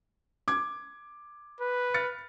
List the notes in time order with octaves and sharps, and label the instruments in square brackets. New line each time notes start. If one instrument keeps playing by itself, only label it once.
[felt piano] D6 G#6
[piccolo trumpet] B4
[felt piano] F6 A6 C#7